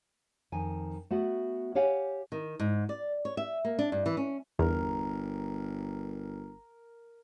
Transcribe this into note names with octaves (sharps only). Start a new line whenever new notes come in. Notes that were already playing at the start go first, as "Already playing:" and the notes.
F2 D#3 G#5
A3 B3 F#4
G4 C#5 F5 F#5 G#5
D#3
G#2
D5
C#5
E5
A#3
D4
G2
E3
C#4
G1 E2 A#4